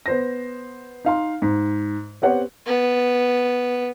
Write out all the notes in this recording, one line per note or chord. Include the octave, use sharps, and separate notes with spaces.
B3 C5 A#6
D#4 F5 C6
G#2
B3 C4 G4 C#5 F#5
B3